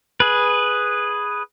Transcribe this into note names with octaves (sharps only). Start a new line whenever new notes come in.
G#4 B4